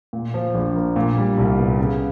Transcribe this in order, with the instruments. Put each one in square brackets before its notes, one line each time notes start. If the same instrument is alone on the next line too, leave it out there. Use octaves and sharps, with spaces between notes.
[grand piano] A#2
F3
A#1
A#3
A#2
G3
C2
B3
C#3